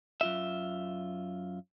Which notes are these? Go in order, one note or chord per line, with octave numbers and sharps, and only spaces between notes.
F#2 F4 E5